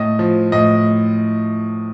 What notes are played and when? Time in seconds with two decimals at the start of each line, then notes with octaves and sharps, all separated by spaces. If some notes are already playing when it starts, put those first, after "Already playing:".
Already playing: A2 D#5
0.19 F3
0.52 A2 D#5